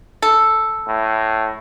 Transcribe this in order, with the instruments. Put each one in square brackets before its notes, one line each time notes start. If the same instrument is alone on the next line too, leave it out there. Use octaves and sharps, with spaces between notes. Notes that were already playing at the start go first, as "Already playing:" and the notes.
[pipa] A4
[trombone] A2